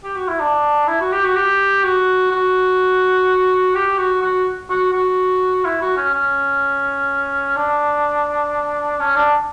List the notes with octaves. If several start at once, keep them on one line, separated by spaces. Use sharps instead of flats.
G4
F#4
E4
D4
E4
F#4
G4
F#4
G4
F#4
F#4
G4
F#4
F#4
F#4
F#4
E4
F#4
C#4
C#4
D4
C#4
D4